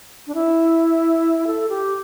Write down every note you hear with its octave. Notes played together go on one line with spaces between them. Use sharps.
D4
E4
A4
G4